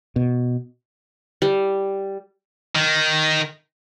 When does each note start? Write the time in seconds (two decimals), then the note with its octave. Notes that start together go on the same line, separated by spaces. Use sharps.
0.16 B2
1.42 G3
2.75 D#3